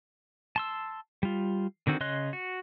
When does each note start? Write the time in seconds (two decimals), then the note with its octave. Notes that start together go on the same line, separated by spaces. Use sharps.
0.56 A5 C6 E6
1.23 G3 F4
1.87 D3 D#3 C4 F#4
2.01 C#3 C#5 D#5 C6 F#6
2.33 F#4